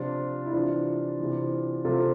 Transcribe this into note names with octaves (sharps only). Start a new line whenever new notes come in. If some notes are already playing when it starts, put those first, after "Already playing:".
Already playing: C3 F3 D4 F4
E4
C3 E3 D4 F4
C3 E3
C3 F3 F4 A4